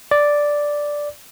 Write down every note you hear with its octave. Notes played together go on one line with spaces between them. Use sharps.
D5